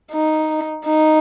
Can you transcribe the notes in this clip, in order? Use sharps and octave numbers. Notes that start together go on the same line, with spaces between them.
D#4
D#4